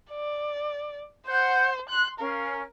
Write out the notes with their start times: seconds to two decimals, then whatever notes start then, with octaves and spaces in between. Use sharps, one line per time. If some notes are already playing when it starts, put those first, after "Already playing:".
0.11 D5
1.27 C5 F#5 G6
1.89 C6 F#6
2.19 C#4 A#4 F5